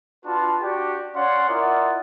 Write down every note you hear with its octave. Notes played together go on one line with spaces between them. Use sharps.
D4 F4 F#4 B4 A5
D4 F#4 G4 D5
C#4 C#5 D5 F5 F#5 C6
E4 F4 A#4 D5 D#5 F#5